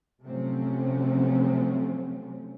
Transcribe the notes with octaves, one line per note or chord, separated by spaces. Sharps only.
C3 F3 F#3 A3 C4 C#4